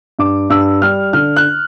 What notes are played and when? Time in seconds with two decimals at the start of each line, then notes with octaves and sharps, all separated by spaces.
0.19 G2 D6
0.50 G2 E6
0.82 G3 F6
1.13 D3 F6
1.36 F#6